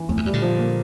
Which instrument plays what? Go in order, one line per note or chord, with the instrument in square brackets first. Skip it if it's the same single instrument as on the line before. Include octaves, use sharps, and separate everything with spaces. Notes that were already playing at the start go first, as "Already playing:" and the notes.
Already playing: [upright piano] E3
[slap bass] F2 [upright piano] A2
[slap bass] E2
[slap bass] F2 [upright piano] G3
[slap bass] A#2 D3
[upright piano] F3
A#3